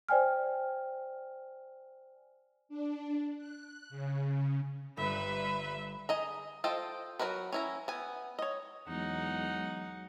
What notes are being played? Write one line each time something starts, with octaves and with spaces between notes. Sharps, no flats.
C5 D5 G5 G#5 F6
D4
F#6
C#3
G1 G3 B4 E5 B5
G#4 D#5 A#5
F4 A4 C5 D#5 G5
F#3 C#4 F#4 A#4 B4
C#4 E4 A#5
B3 G#5
C#5 D#5
E2 F#3 G#3 D#4 F#5